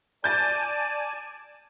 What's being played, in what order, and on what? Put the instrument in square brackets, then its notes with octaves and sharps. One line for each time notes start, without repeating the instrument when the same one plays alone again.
[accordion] D5 G#5 A5 [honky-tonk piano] G6 A6